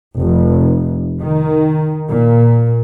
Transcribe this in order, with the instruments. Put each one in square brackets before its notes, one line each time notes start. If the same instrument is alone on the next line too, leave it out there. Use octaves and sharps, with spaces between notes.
[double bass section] F1
D#3
A#2